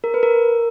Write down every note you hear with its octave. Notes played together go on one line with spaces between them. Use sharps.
A#4
B4
A#4